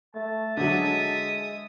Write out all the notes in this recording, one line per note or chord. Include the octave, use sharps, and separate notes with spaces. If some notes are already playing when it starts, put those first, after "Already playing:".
A3 A5
D3 F#3 G#3 E5 D#6